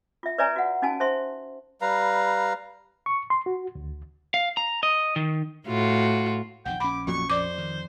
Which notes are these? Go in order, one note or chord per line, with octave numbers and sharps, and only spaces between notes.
F4 E5
B4 C#5 D5 E5 G#5 A#5
F#4 F#5
C#4 D#4 F#4 G#5 A5
C5 E5 C6
G3 B4 F5 A#5
C#6
C6
F#4
D2
F5
A#5
D#5
D#3
A2 F4 F#4
B1 F2 D#3 F#5 G5
A#1 C#4 B5 D6
F2 A#2 F#3 C#6
F2 C5 D5 D6
D#3